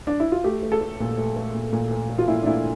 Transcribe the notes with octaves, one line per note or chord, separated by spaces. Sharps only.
D4
E4
F4
A3 G4
A3
A4
A3
A#2
A3
A3
A#2
A#2
A3
A3
F4
A#2 E4
D4
A#2 E4